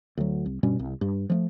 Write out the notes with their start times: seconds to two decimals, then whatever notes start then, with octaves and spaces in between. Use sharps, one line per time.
0.17 D2 F#3
0.46 C2
0.63 G2 B2 G3 C#4
0.79 C2
1.01 G2
1.30 F3 G#3 A3